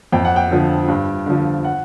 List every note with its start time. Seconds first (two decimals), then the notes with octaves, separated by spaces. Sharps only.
0.12 F2 G5
0.25 F#5
0.36 G5
0.51 D3 F3
0.88 G2
1.26 D3 F3
1.65 F#5